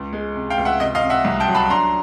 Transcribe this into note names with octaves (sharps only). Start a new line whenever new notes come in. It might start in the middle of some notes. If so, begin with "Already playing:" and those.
Already playing: C#2
G#3
C3
F5 G5
C#2
E5 F#5
C3 D#5
D#5 F5
C3
E5 F#5
C2
G5 A5
F#3
A5 B5
D4 A#5 C6